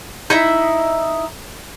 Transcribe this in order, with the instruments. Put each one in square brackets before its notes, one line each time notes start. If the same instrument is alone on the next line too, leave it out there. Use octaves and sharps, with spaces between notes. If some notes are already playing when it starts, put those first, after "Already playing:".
[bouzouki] D#4 E4 E5